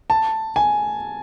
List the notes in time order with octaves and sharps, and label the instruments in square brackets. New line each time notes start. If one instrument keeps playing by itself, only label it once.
[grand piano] A5
G#5